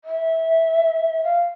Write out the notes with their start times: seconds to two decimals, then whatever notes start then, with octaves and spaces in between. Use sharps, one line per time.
0.05 E5
1.24 F5